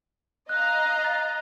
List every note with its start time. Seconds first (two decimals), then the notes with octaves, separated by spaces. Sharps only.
0.49 D#5 F5 A#5 F#6
1.04 A6